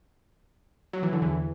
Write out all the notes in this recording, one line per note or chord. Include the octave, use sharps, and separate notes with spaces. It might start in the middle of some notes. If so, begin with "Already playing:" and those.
F#3
E3
D3
E2 E3